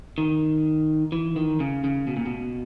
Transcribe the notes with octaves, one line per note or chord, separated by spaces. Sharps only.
D#3
E3
D#3
C#3
C#3
B2
A#2
B2